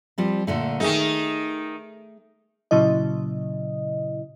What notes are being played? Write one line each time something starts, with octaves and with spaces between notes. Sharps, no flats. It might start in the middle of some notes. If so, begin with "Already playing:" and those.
F3 G3 C4
A#2 D3 A3
D#3 A3 D#4 G#4
A#2 C#3 F#3 E4 D#5